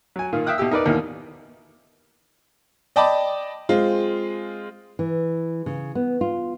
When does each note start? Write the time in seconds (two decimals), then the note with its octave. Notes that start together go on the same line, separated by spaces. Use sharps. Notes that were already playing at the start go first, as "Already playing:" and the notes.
0.16 F#3 G#5
0.33 A#2 D#3 F4
0.46 E5 F5 G5 D#6 F#6
0.58 B2 E4 G4 E6
0.71 D#4 A#4 B4 D5
0.86 D#2 B2 D#3 E3 F6
2.96 D5 D#5 G5 A5 B5 D6
3.69 G#3 C4 F4
4.99 E3
5.66 C#3
5.95 B3
6.21 F4